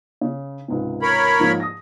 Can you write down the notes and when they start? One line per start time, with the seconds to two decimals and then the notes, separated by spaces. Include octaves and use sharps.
0.21 C#3
0.68 C#2 G#2 C3
1.02 A#4 C#5 B5
1.40 G#2 F3 A#3
1.60 D#6 A#6